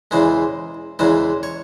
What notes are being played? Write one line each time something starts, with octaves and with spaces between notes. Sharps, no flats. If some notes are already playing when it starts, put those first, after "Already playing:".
E2 C#3 E3 G#3 C5
E2 C#3 E3 G#3 C5
C#5